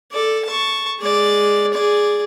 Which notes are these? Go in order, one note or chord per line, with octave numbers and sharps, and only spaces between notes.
A4 D5
A5 C#6
G#3 D5
G#4 D5